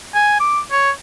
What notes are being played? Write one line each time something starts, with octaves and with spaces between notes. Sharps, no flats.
G#5
D6
C#5